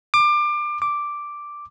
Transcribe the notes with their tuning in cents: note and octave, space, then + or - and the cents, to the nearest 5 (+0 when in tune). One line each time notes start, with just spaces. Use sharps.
D6 +25
D6 +0